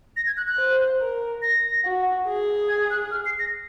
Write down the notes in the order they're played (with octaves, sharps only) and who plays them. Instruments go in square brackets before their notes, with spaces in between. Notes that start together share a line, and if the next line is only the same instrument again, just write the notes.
[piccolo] A#6
G#6
F#6
F#6
[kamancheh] C5
A#4
[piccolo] A#6
[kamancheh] F#4
G#4
[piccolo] G#6
F#6
F6
C7
A#6